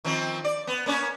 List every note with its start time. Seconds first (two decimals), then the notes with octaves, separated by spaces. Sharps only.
0.05 D#3 F3 C4
0.44 D5
0.67 B3
0.86 A#3 C#4 C#5